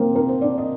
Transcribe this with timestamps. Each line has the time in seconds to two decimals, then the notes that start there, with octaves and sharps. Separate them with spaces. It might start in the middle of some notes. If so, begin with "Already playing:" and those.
Already playing: A#3 C4 A#4 C5
0.15 A#4
0.29 C5
0.41 D4 D5
0.58 D#5